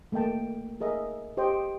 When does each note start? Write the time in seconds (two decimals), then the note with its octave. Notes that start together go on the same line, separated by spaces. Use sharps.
0.12 A3 A#3 D#5 G5 A5
0.80 G#4 A#4 D#5 E5
1.37 G4 C5 D#5 G5